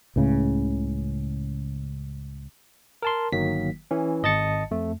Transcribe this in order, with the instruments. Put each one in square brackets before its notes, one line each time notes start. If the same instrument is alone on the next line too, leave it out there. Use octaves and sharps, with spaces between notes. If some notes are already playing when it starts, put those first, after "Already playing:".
[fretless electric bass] C#2 A2 C#3
[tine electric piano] A#4 A5 C6
G1 D#3 F#3 A#3 B6
E3 C#4
G#1 D#5 A5 A6 C#7
F2 A3